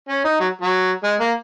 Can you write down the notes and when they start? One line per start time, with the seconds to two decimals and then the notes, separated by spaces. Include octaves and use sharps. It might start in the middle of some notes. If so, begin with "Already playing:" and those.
0.09 C#4
0.25 D#4
0.40 F#3
0.62 F#3
1.04 G#3
1.20 A#3